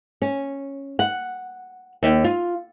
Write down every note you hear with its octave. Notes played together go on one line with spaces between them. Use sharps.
C#4
F#5
D#2
F4